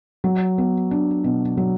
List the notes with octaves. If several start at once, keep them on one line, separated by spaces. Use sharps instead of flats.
F#3
B3
D4
B2
F#3